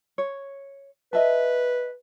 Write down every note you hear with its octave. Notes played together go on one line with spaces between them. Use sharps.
C#5
B4 D#5 E5 A5